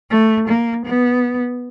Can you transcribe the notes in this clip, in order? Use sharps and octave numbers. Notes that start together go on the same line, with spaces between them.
A3
A#3
B3